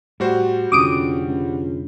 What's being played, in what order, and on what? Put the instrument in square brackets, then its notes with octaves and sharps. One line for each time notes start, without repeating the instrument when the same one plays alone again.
[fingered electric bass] A2 [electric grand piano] G3 F#4 C5
[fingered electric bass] F1 D3 [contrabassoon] C#2 [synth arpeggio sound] D6 D#6 D7
[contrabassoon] C#2